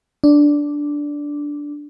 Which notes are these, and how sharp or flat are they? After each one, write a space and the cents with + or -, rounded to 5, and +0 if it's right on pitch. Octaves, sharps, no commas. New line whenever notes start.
D4 -5